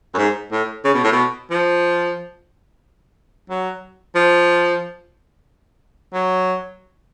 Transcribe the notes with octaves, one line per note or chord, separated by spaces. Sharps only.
F#2
G#2
A2
C#3
B2
A2
B2
F3
F#3
F3
F#3